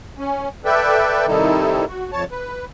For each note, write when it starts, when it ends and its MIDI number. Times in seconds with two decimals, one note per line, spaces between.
0.18 0.49 61
0.65 1.26 69
0.65 1.26 71
0.65 1.26 74
0.65 1.26 76
0.65 1.26 79
1.27 1.85 48
1.27 1.85 51
1.27 1.85 55
1.27 1.85 63
1.27 1.85 64
1.27 1.85 69
1.88 2.11 66
2.12 2.24 41
2.12 2.24 73
2.12 2.24 81
2.32 2.65 71